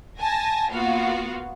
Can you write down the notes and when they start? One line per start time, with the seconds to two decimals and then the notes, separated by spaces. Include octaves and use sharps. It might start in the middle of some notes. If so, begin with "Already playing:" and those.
0.19 G#5 A5 A#6
0.71 A#3 B3 F4 F#4 F5